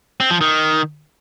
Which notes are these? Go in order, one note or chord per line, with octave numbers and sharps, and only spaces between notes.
C4
F3
D#3